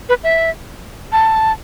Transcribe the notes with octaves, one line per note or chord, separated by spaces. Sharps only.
B4
E5
A5